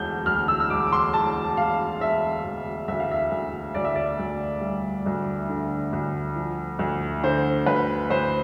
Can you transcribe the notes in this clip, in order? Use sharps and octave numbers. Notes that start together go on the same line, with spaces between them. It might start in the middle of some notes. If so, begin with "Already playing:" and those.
Already playing: E1 D2 G6
D2 F6
E6
E6
E1 D6
D6
C6
E1 A5
E1 F5
E1 E5
E1
D2 E5
F5
E5
D2
D2 D5
E5
D5
D2
G3
D2
D3
D2
F3
D2
D3 C5
D2 B4
D2 C5